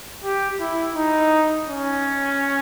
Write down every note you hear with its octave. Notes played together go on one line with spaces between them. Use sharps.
G4
E4
D#4
C#4